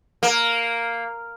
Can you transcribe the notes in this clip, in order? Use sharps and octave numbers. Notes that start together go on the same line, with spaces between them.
A#3